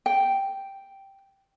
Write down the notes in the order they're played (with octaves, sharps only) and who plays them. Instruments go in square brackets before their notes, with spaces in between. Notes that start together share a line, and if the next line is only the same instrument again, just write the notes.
[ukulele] G5